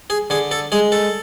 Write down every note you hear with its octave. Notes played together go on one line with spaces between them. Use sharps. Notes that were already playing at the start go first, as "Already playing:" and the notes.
G#4
D3 G#4
A4
G#3 G#4
A4